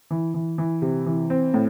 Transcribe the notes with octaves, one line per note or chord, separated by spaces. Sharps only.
E3
E3
E3
C3
E3
C4
A2